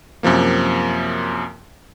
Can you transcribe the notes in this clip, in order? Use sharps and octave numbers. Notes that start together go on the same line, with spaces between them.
F#2 C3 F3 A#3